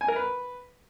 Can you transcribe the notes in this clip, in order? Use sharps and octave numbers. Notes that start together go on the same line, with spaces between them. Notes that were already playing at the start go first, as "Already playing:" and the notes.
G#5
A#4
B4